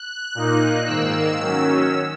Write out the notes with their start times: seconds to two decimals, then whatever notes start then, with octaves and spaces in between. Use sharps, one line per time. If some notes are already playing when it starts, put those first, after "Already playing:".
Already playing: F#6
0.35 A#2 A#3 D#4
0.87 G#2 D#3 A#3 E6
1.38 D#3 F#3 C#4